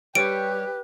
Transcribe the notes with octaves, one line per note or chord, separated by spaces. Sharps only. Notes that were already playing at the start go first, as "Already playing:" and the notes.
G3 G4 B4 C#5 D7